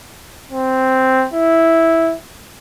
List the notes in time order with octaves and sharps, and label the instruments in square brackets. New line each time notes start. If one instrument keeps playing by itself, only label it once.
[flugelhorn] C4
E4